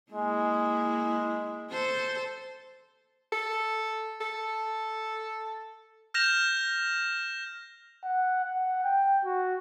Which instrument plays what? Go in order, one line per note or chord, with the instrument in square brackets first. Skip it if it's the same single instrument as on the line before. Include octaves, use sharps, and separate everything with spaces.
[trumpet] G#3 [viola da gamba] A#3 E4
[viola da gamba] A4 C5
[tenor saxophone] A4
A4
[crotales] F6 G6 A#6 E7 F7
[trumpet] F#5
F#5
G5
F#4